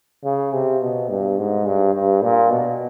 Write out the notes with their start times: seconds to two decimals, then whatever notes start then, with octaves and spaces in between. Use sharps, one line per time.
0.24 C#3
0.53 C3
0.81 B2
1.10 G2
1.38 G#2
1.66 G2
1.94 G2
2.22 A#2
2.50 B2